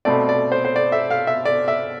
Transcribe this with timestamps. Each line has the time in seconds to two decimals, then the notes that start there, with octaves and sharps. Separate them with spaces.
0.05 B2 A3 C4 D5
0.29 D5
0.52 C5
0.65 C5
0.76 D5
0.92 E5
1.10 F5
1.27 E5
1.45 D5
1.68 E5